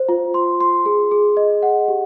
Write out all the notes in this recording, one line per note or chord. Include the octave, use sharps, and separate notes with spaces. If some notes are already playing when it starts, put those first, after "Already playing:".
Already playing: C5
F4
C6
C6
G#4
G#4
D#5
F#5
G4